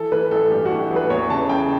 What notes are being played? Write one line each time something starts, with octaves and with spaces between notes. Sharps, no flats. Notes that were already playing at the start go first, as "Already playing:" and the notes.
Already playing: E3 A4
E3 B4
A1 A4
G2 G4
F#4
E3
G4
A1
B4
E2 C#5
C#3 A5
C#3 G5